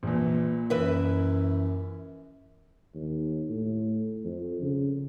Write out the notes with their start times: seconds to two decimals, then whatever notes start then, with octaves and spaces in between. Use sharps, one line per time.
0.03 A#1 A#2 E3
0.70 F#2 E3 B4 E5
2.95 D#2
3.49 A2
4.25 F2
4.62 C#3